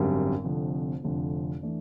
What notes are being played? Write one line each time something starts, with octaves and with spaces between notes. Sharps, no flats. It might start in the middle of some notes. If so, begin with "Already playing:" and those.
Already playing: G#1 F#2 D3 G3
F1 F2 D3
F1 F2 D3
E3 A3 D4